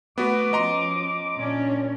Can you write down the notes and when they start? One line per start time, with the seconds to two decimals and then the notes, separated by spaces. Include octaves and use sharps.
0.18 A3 B3 F#4 B4 D6
0.53 F3 C#4 D#5 A#5 C6
1.37 A#2 C#4 D4